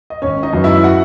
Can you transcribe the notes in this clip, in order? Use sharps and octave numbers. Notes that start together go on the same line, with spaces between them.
D#5
G#1 C#4 C#5
D#4 D#5
F#2 C#3 F#3 B3
E4 E5
F#4 F#5